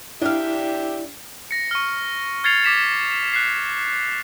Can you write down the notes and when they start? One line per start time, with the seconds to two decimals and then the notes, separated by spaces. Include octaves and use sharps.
0.22 D4 E4 G4 E5 F5 G5
1.51 A#6 C#7
1.71 C#6 F6
2.44 F6 G#6 A6 C7 C#7 F7
2.64 D6 B6 E7
3.33 F#6 C7